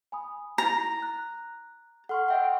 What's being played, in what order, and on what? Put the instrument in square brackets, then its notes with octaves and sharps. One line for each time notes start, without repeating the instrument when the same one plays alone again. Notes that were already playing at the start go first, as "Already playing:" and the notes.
[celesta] G#5 B5 D#6
[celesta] E4 A6 [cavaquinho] A#5
[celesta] F#6
[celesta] A4 F6 [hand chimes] F#5 C6 C#6
[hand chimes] D#5 E5 F#5 [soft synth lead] G5